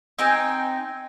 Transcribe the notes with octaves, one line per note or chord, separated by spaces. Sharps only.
C4 D#4 G5 G#5